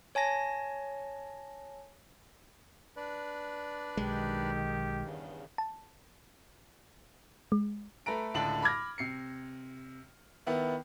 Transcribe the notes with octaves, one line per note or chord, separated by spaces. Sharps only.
C#5 G#5 A5 A#6
D4 B4 D5
B1 D#3 G#3 G4
E2 G2 C#3
A5
G#3
A3 A4 B4 A#5 D7
C#2 A2 D3 A5 F#7
B5 D6 F6 G#6 A#6
C3 C7 C#7
D#3 B3 E4